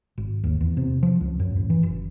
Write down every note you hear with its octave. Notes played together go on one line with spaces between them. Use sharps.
G#1
D#2
E2
C3
F3
C#2
F#2
A1
E3
F#1